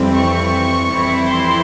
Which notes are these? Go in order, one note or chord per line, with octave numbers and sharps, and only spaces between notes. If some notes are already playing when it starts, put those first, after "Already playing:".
Already playing: F2 E3 G3 C4
C#6
F2 E3 G3 C4 E4
C6